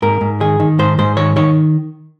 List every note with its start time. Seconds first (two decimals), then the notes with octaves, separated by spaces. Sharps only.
0.02 G#2 A#4
0.21 G#2
0.41 D#3 G#4
0.60 D#3
0.79 G#2 C5
0.98 G#2 C5
1.17 D#3 C#5
1.36 D#3 C#5